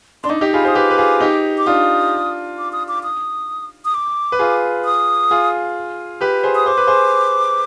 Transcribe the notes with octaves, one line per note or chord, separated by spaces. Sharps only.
D4 C6
D#4 D6
D#4 G4
F4 G#4 B5
G#4 C5 D#6
G4 B4 D6
B4
F4 G#4
D#4 G4
D6
D4 F4 D#6
D6
D#6
D6
D#6
D#6
D6
B4
F4 G#4
D#6
F4 G#4
G4 B4
G#4 C5
D#6
C5 D6
B4
G#4 C5